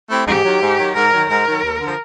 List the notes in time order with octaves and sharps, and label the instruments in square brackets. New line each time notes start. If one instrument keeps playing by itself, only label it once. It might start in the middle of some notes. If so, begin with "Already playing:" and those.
[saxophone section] A3 C4 E4 G4
[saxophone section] G#2 [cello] G4
[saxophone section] D#3 F#3
G#2
D#3 F#3
[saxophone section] G#2 [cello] A#4
[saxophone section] D#3 F#3
[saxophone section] G#2 [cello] A#4
[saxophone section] D#3 F#3
D#2
D3 F3